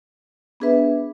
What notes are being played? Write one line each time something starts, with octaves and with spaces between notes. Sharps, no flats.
B3 D4 G#4 B4 E5